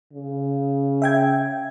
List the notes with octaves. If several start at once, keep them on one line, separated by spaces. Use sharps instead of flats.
C#3
E5 G5 G#6